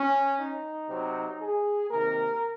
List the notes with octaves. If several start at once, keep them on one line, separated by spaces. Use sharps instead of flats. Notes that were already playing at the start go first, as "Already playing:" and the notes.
Already playing: C#4
D#4
C3 F#3 C4
G#4
C3 D#3 A#3 A#4